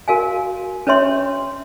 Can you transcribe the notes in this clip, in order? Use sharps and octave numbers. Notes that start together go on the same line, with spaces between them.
F#4 A#4 F5 G#5
C#4 B4 C#5 E5 C6